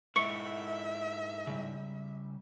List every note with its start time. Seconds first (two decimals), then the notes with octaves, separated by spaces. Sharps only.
0.16 G#2 E4 A#4 D#5 E5 C#6 C#7
1.47 C#3 G3